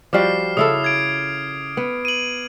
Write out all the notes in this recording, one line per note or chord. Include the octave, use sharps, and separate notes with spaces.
F3 G3 F#4 D6 F6 C7
C#3 E4 A4 D#6
G#6 D7
B3
D#7 F#7